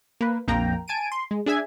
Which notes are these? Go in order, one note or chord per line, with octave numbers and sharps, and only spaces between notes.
A#3 B4
A#1 F2 A#3 G5 A#5
G#5 A5 D7 D#7
C6
G#3
D4 G#4 E5 G#5 G#6